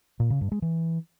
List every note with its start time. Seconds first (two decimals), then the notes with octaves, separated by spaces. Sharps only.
0.20 A#2
0.30 C#3
0.41 G2
0.52 G#3
0.62 E3